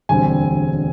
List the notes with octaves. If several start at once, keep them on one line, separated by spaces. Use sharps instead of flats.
E1 D2 D3 G3 C4 G#5